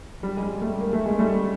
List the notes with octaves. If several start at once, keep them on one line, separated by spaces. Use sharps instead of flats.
G3
G#3
G3
G3 A3
A#3
A3
G#3
G3 A3